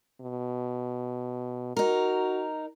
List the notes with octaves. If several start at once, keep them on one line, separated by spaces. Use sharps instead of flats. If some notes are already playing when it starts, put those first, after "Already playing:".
B2
D#4 F#4 A#4